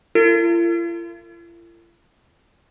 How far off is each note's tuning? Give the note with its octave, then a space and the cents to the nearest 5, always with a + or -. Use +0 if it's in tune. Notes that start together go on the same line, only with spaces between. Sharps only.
F4 -45 A#4 -45